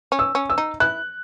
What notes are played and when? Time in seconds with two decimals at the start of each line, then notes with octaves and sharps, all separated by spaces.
0.12 C#4
0.19 E6
0.35 C#4
0.50 E6
0.58 D#4
0.80 E4 F#6